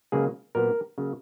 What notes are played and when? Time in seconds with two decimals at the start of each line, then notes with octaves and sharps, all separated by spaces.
0.12 C#2 C#3 F#3 A#3 G#4
0.55 A#2 F#3 B3 A#4
0.98 C#3 F#3 A#3